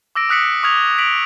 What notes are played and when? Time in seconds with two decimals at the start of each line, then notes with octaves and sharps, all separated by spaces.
0.15 D6 E6 A#6 D7
0.29 D#6 F#6 B6 C#7 F#7
0.63 C#6 D#6 F6 G#6 F7
0.98 B6 D7 F7 F#7